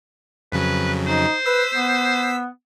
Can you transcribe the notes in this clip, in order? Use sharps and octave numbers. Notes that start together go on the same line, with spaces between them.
F2 C#3 F#3 B4
D#4 C5
B4 E6 B6
B3